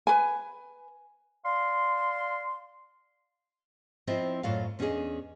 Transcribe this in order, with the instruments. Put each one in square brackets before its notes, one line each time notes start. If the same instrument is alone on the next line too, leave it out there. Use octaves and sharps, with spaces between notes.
[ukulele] B4 G#5
[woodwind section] D5 F5 C6
[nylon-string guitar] F3 C4 E4 F4 D#5 E5
F#2 A2 F#3 F4 D5 F5
E2 C#4 D4 G4 G#4 D#5